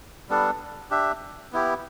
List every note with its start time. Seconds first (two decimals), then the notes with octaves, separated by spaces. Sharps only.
0.29 G3 B3 D4 A4
0.91 D4 G4 E5
1.52 B3 E4 G4